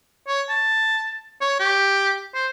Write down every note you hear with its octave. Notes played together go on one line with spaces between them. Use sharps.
C#5
A5
C#5
G4
C5